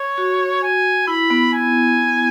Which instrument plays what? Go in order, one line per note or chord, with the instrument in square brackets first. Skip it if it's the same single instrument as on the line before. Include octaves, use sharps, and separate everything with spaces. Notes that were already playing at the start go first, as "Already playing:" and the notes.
Already playing: [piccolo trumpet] C#5
[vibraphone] F#4
[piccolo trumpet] G#5
[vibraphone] E4 [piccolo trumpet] B5
[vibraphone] B3
[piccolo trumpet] G#5